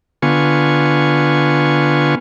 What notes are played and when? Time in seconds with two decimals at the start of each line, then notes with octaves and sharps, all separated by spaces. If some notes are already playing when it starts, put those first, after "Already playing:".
0.22 D3 B3 F4 G#5 C#6